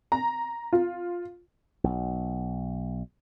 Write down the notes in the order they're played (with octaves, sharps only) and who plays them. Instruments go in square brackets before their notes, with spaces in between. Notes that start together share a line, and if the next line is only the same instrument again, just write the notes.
[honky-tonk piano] A#5
F4
[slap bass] B1